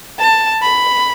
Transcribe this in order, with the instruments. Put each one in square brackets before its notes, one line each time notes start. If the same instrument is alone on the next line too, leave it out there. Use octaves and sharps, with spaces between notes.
[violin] A5
B5